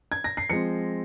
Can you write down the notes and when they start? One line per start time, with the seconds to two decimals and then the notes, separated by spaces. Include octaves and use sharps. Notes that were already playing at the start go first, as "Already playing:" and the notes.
0.12 G#6
0.24 A#6
0.37 C7
0.50 F3 G#3 C4 C#7